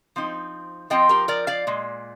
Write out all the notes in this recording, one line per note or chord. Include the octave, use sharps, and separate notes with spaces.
F3 C4 D#4
F3 C4 F4 D#5 G5
G4 A#4
A#4 D5
D5 F5
A#2 G#3